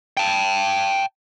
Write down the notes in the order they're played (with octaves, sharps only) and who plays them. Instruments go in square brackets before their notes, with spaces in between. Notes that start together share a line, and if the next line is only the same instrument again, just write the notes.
[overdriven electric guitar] G5 A5